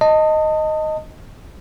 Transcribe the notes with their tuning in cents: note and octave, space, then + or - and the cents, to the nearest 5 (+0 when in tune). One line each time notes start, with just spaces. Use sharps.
D#5 +0 A5 +30